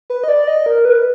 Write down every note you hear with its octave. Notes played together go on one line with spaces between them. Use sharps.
B4
D#5
D5
D#5
A#4
B4